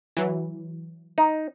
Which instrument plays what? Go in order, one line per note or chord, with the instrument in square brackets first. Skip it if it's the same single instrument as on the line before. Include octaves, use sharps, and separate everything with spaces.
[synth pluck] E3 F#3
[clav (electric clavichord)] D#4